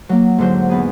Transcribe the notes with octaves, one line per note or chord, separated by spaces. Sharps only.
F#3 A#3
G#2 D3 F#3 C5
E2 B3 G#4